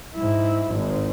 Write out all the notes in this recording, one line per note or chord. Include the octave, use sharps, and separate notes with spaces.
G#2 E4
G#1 G#2